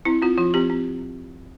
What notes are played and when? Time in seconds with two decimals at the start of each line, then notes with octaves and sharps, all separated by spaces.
0.05 C4 E4
0.22 C4 F4
0.38 F3 F4
0.54 C4 G4
0.70 C4